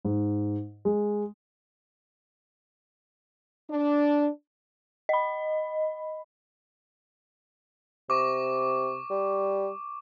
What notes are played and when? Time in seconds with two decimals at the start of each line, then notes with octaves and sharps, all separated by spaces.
0.05 G#2
0.85 G#3
3.70 D4
5.09 D#5 B5
8.10 C3 C#6 D6
9.11 G3